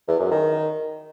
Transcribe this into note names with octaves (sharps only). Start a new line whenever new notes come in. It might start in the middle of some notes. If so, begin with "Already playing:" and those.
E2
F#2
D#3